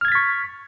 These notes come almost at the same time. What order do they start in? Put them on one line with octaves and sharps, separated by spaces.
F6 G#6 A6 B6 C#6